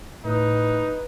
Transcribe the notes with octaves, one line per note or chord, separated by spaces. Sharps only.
A2 D#4 B4